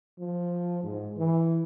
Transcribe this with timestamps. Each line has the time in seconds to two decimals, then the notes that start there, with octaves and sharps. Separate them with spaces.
0.19 F3
0.84 G#2
1.17 E3